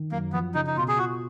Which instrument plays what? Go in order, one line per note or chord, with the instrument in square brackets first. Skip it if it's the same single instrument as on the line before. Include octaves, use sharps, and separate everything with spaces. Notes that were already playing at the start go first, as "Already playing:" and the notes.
Already playing: [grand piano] D#3
[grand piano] F#2 [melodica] A#3
[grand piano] F3 [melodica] B3
[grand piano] C#3 [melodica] D#4
[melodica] D#4
[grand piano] B2 [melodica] F4
[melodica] G#4
[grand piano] F4 [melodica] F#4